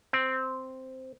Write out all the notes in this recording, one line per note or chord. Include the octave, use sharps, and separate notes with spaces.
C4